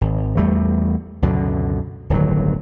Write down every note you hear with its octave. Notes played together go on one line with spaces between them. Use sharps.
G#1
E2 G3 A3
C#2 F#2 B2 D3
D1 G1 D#3 F#3